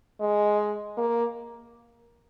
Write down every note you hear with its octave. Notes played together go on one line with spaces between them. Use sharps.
G#3
A#3